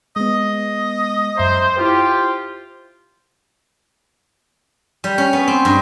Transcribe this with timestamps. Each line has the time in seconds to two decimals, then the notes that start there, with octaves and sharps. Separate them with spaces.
0.16 G#3 B3 D#5
1.37 F#2 C5 E5 A#5
1.77 E4 F4 G4 C5
5.04 G3
5.18 C#4
5.33 B3
5.48 C4
5.65 G2